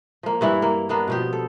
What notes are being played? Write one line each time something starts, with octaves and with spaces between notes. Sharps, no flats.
F3 A#3
G2 E3 E4 F#5
A#3
A#3 B3 D4
B2 F3 G4
A4